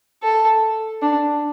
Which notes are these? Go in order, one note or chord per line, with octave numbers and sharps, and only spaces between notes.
A4
D4